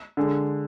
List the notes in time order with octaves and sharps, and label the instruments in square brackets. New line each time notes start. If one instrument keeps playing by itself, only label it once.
[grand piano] D3 G#3